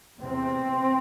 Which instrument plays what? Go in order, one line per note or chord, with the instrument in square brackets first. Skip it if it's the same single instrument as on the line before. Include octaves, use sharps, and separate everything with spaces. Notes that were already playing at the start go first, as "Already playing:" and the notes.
[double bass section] E2 C3 C4